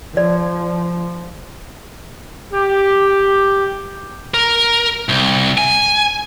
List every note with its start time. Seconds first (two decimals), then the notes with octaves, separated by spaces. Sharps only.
0.17 F3 D5
2.52 G4
4.34 A#4
5.09 C2
5.58 G#5